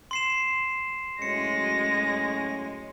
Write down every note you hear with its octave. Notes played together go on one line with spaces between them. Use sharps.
C6 C7 E7
A2 F#3 G#3 C#4 A#6 C#7